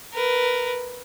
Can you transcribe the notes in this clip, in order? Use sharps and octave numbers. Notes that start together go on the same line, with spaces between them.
A#4 B4